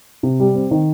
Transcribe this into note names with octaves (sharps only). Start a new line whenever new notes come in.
C3
G3
C4
D#3